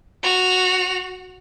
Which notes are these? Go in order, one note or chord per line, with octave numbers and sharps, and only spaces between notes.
F#4 F7